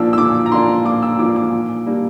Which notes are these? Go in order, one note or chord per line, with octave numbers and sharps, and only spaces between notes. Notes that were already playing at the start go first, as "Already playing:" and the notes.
Already playing: A#2 F3 A#3 D4 E6
E6
A#2 D6
A#5
F3 A#3 D4 C6
A#2 D6
E6
F3 A#3 D4 D6
D6
A#2
G3 A#3 D4